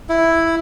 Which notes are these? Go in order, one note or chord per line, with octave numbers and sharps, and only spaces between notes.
E4